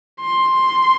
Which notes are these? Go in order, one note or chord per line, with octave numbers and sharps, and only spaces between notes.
C6